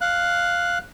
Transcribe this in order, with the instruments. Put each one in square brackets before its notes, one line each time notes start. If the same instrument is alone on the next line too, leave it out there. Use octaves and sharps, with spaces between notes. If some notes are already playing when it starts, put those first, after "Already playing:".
[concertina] F5 F#6